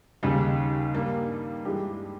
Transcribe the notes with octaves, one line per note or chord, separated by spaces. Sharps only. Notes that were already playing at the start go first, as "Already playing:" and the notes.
D#2 C#3 G3 D#4
G2 G3 A#3
G2 E3 G#3 G4